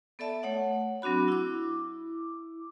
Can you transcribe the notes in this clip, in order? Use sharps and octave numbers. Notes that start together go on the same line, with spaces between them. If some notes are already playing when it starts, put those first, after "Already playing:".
B3 A4 D5 E5 A5
A3 C#5 F#5
F#3 C4 D4 F#4 B5
E4 D6